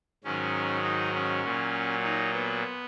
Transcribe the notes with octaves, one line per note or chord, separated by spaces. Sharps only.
G#2 D#3 F#3 C#4
D#4
C#4
A#2 F#3
D#4
B3